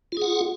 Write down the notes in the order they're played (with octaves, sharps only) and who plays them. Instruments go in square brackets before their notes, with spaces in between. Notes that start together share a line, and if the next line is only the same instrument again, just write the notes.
[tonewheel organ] F4
G#4
F#5